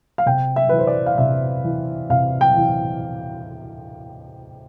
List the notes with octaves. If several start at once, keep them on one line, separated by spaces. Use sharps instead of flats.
F5
C3 G5
E5
E3 B4
C5
D5
F5
C3 E5
E3
C3 F5
G5
E3